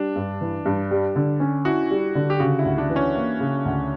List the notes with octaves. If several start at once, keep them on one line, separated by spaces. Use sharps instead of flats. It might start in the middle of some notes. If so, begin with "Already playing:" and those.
Already playing: G3 D4
G2
E3
G2
G3
D3
C#4
E4 F#4
G3
D3
G4
C#3 F#4
E4
D2
D4
E3
C#4
A#3
C#3
D2